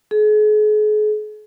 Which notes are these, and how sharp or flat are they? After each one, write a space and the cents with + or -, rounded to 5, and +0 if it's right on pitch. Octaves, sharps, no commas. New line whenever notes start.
G#4 +40